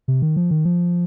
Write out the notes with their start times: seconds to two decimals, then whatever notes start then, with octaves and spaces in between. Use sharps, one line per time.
0.08 C3
0.22 D#3
0.36 F3
0.51 D#3
0.65 F3